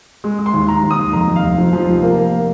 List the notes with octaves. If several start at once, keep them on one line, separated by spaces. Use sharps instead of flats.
G#3
G#3
C6
D#2
D#2 A#5
D#2
D#6
D#2
F2 A#5
F2
F5
F1
F3
F3
F1
A#3
A#3